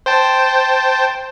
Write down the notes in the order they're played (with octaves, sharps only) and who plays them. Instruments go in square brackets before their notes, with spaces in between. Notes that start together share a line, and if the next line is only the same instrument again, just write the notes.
[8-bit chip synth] C5 G5 A5